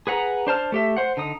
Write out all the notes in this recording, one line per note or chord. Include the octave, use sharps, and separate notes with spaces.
G#4 B4 F#5 A#5
D4 C5 A5 F6
A3 G4 E5
C5 F#5
D3 D#4 D#6